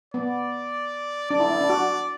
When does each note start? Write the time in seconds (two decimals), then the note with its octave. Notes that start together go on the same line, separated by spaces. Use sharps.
0.14 B3 D5
1.30 D4 D5
1.40 E4
1.51 E4
1.61 D4
1.69 F#4